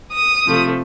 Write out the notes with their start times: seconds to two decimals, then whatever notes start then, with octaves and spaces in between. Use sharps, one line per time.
0.12 D#6
0.45 C3 F3 A3